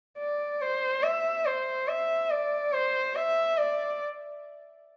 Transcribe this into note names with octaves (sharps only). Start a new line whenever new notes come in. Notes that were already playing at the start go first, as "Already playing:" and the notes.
D5
C5
E5
C5
E5
D5
C5
E5
D5